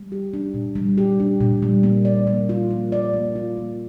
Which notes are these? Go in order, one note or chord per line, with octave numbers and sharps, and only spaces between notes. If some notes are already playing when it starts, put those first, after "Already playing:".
Already playing: G3
G4
D4
A#2
G3
G4
D4
A#2
G3
A#3
D5
A#3
F4
A#3
D5
A#3
F4
A#3